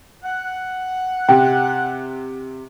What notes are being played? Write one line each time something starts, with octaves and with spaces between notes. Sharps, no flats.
F#5
C3 G5